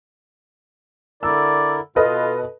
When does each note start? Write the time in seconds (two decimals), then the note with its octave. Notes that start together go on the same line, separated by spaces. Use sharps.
1.23 D3 E4 A#4 D5 E6
1.96 B2 F4 A4 B4 D#5